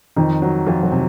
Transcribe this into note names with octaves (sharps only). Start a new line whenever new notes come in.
F2 D#3 D#4
F#3
F2 F3 F4
F#3 F#4
C3